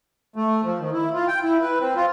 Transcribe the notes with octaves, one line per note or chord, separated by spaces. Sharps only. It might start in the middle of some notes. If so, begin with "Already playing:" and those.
A3
F3
D#3
E4
F4
G5
E4
B4
C4
F4